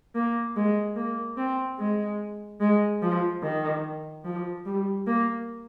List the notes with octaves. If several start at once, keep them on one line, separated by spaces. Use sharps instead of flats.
A#3
G#3
A#3
C4
G#3
G#3
F3
D#3
F3
G3
A#3